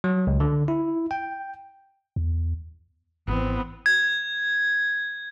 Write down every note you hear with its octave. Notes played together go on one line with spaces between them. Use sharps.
F#3
C#2
D3
E4
G5
E2
G#1 E3 B3 C4
G#6